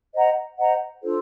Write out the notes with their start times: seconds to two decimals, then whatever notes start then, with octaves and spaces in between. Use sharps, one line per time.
0.14 C5 D#5 F#5 A#5
0.59 C5 D#5 F#5 A#5
1.03 D4 F4 A4 C5